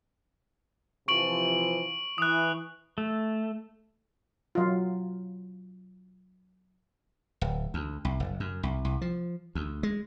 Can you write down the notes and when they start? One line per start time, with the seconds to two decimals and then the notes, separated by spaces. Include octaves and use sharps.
1.08 C3 E3 F3 C#6 D7 F#7
2.18 E3 D#6 F#6
2.98 A3
4.55 F#3 F4
7.41 D1
7.74 D2
8.05 C2
8.20 F#1
8.40 F#2
8.63 C2
8.85 C2
9.01 F3
9.55 D2
9.83 G#3